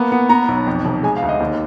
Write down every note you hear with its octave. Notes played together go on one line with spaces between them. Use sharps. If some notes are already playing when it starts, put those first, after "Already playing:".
Already playing: A#3 B3
B3
B3 A#5
B1
F2
F1
G#3 G#5
F5
D2
D#5
D#2